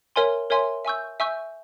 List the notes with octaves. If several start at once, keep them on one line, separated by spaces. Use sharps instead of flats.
A#4 C#5 E5 G#5 C6
A#4 C#5 E5 G#5 C6
E5 G#5 C#6 E6 G6
E5 G#5 C#6 E6 G6